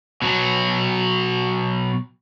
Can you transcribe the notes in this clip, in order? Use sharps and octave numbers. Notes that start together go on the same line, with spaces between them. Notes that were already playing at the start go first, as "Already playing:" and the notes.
B2 F#3